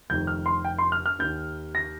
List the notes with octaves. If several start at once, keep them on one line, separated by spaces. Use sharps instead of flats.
F1 F2 D#3 G6
F6
C6
G5
C6
F6
F6
D#2 D#3 G6
A#6